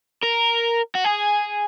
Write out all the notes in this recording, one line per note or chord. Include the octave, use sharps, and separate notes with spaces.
A#4
F#4
G#4